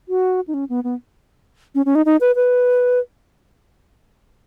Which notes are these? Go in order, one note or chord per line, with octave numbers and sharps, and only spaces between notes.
F#4
D#4
C#4
B3
B3
C#4
C#4
D#4
D#4
B4
B4